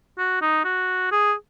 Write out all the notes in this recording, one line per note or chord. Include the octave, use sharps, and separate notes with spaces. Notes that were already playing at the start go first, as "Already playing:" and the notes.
F#4
D#4
F#4
G#4